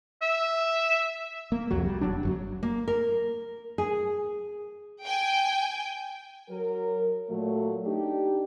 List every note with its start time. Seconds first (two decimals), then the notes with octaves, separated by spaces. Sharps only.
0.22 E5
1.52 A#3
1.71 C2 F2 F#3
1.86 G3
2.01 E1 F#3 D4
2.23 G1 F#2 F#3
2.63 A#3
2.88 A#4
3.78 G#4
5.05 G5 G#5
6.50 F#3 A#4
7.29 A#2 F#3 A3
7.85 D4 D#4 G4